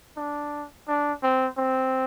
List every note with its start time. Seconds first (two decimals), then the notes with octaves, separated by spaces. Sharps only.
0.17 D4
0.88 D4
1.23 C4
1.58 C4